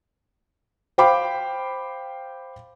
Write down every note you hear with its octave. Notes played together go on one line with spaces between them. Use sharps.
C5 F5 G5 B5 D6